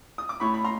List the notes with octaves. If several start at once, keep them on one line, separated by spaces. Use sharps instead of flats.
D#6
D6
A2 B5 C#6
B5
A#5 C6